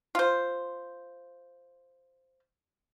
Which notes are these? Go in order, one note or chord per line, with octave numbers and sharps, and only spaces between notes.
F4 C5